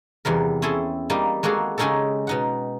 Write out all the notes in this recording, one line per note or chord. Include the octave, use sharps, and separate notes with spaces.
E2 C3 G3 A#4
C4 C#4 E4 G#4 A4
G3 A#3 C4 D#4
G#3 A#3 F#4 G#4 A4
C#3 G#3 C#4 D#4 G4 A4
B2 D#4 F#5